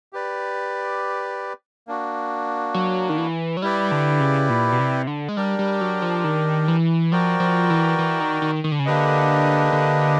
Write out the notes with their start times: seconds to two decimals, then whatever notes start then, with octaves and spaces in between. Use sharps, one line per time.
0.13 G4 B4 D5
1.88 A#3 D4 F#4
2.74 F#3
3.10 D#3
3.18 E3
3.57 F#3
3.62 G3 E4 G4 B4 D5
3.91 D3
4.20 C#3
4.49 A#2
4.72 B2
4.79 C3
5.07 D3
5.29 G#3
5.37 G3 D4 G4 A#4 D5
5.59 G3
5.81 F#3
6.02 F3
6.24 D#3
6.68 E3
7.12 F3 F#4 A#4 D5 G5
7.40 F3
7.70 E3
7.99 E3
8.21 D#3
8.42 D#3
8.64 D#3
8.72 D3
8.79 C#3
8.86 D3 A#3 D4 G4 B4 D#5
9.73 D3